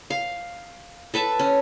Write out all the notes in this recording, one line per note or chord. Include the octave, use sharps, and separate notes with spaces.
F5
A4 B4 E5 A5
C#4